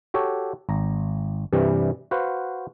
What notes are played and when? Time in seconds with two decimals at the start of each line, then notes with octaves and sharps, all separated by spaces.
0.14 F#4 G4 A4 C#5
0.69 G#1 A#5
1.53 G2 C3 E3 G3
2.11 F#4 B4 C5 F5 F#5